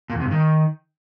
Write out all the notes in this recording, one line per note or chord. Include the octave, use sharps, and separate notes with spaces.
A#2
E2
C3
G2
D#3